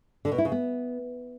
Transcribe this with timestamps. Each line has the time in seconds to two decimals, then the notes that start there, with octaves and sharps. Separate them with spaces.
0.25 D3
0.32 B2
0.38 E4
0.45 C#3
0.52 B3